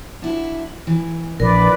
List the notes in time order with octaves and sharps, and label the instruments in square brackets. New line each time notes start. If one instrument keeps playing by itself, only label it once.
[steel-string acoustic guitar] D4 E4 F#4
E3
[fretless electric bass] A#1 [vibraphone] A#4 [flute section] B4 D5